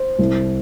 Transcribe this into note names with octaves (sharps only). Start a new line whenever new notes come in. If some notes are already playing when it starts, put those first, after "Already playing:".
Already playing: C5
C2